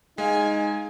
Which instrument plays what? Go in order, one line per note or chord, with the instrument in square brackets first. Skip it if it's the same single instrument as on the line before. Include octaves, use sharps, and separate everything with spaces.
[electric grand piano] G#3 F5 [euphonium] D#4 [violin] G#5